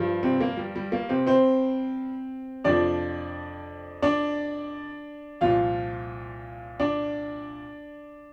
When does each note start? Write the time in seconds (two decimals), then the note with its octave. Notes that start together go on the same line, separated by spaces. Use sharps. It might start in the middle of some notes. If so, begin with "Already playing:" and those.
Already playing: G2 F3
0.23 C3 C4
0.41 A#3
0.57 G3
0.76 G3
0.92 A#3
1.09 C3 C4
1.27 C4 C5
2.64 F2 C3 F3 D4 D5
4.02 D4 D5
5.41 C2 A#2 F3 F4 F5
6.80 D4 D5